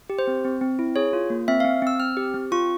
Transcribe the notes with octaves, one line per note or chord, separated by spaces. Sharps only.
G4
C5
C4
C4
C4
E4
G#4 C#5
F4
A#3
C4 E5
F5
C4
C4 E6
C4 F6
G4
C4
F4 C#6